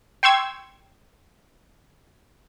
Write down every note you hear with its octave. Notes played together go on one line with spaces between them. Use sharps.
G5 C6 C#6 E6 G#6